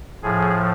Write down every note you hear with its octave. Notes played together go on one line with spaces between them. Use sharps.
A2 F3 G#4